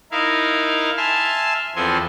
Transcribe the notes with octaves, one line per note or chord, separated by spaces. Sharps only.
D#4 E4 A#4 F5
E5 G#5 A5 C6 F6
E2 F3 C4 A4 G#5 C6